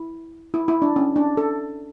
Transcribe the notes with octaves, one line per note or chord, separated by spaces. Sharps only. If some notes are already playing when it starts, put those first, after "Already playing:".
Already playing: E4
E4
E4
D4
C#4
D4
A4